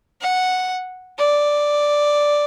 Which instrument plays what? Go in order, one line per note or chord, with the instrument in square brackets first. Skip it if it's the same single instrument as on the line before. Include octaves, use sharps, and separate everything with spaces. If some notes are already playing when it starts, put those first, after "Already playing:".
[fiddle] F#5
D5